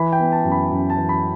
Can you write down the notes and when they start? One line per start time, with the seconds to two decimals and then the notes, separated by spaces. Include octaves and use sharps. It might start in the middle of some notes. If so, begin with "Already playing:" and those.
Already playing: E3 B5
0.13 G5
0.19 B3
0.32 A5
0.44 F#2
0.52 B5
0.71 F#2
0.90 A5
0.97 E3
1.09 B5